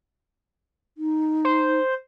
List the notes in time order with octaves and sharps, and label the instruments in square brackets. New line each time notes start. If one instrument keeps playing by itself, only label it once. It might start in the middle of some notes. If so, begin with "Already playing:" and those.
[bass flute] D#4
[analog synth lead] C5